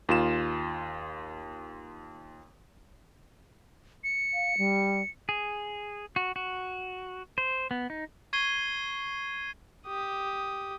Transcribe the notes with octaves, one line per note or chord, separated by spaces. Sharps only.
D#2 F4 E7
C#7
F5
G3
G#4
F#4
F#4
C5
B3
D#4
C#6 G#6 C7 D#7 G7
G4 D#6